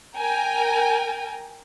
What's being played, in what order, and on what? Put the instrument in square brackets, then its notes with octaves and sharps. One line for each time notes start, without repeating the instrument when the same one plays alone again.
[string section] A#4 G5 G#5 A#5